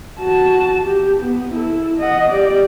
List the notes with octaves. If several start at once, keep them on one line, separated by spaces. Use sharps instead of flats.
F#4 A5
G4
B3
E4 A4
D#5 F#5
G4 D5